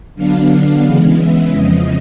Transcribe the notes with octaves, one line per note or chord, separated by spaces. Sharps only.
D3 F#3 B3 D4 F5
F5
C#3 E3 G#3 B3
E5
F2 C#3 F3 D#5